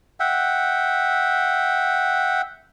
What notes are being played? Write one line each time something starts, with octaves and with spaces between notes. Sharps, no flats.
E5 F#5 G5